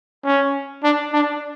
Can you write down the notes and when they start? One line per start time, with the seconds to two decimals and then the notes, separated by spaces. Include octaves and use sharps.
0.25 C#4
0.83 D4
1.13 D4